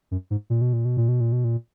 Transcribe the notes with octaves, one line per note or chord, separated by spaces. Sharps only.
F#2
G#2
A#2
B2
A#2
B2
A#2
B2
A#2
B2
A#2